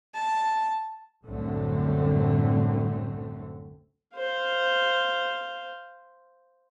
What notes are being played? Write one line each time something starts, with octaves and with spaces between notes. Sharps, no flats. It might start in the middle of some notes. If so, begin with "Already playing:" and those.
A5
C2 F#2 A2 D3 A3 C4
C5 F5